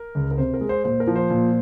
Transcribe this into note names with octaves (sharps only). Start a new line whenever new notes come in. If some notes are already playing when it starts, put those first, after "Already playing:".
Already playing: A#4
C#2
A#4
C3 C5
A#4
G#3
C5
A#2 C5
A#4
F3
C5
A#2